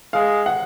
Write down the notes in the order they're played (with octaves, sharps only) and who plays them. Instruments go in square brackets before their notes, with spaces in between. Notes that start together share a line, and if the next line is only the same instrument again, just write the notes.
[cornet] G#3 [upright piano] F5
[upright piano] F#5